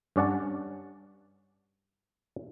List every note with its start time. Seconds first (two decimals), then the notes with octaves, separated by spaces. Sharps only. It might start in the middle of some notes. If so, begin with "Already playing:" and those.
0.16 G2 C#4 D5 F#5 A5